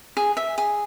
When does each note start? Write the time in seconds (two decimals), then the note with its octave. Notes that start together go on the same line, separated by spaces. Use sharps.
0.17 G#4
0.37 E5
0.58 G#4